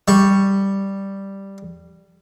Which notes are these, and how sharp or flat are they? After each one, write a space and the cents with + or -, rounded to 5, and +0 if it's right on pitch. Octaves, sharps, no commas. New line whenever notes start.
G3 +0 C#6 +0